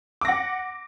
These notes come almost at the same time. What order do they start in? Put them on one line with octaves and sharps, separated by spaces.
D6 A#6 F#5